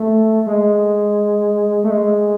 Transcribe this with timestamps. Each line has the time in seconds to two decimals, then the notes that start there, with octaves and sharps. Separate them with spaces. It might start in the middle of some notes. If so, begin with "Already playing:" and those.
Already playing: A3
0.47 G#3
1.84 A3
1.91 G#3